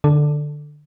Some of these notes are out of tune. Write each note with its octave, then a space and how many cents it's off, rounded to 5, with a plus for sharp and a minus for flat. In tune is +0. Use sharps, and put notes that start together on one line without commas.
D3 +15 A4 +0 D5 +5